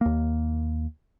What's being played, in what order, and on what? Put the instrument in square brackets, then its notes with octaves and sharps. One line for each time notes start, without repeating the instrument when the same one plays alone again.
[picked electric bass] D#2 A#3